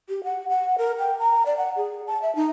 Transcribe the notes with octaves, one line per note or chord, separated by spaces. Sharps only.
G4
F#5
F#5
A#4
G5
A#5
D5
F#5
G#4
A5
E5
D#4